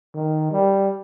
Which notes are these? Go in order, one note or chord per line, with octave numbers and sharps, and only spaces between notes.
D#3
G3